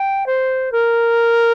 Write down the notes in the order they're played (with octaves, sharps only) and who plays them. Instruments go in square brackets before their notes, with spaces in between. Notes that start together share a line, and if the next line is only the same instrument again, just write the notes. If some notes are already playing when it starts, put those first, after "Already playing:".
Already playing: [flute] G5
C5
A#4